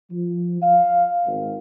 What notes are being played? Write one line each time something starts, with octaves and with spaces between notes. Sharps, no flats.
F3
F5
G#1